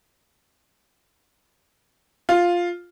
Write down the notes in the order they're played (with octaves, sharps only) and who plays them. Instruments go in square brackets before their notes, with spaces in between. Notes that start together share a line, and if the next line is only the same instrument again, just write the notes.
[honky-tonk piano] F4